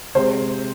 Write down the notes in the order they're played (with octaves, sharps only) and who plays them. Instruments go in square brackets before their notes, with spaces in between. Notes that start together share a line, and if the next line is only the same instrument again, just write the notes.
[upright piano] C3 G#3 C4 C5